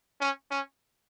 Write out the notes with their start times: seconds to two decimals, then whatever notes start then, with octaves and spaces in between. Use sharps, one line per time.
0.21 C#4
0.51 C#4